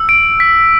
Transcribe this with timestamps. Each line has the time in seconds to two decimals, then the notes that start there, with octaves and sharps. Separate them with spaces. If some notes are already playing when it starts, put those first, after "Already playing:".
Already playing: E6
0.09 D7
0.40 B6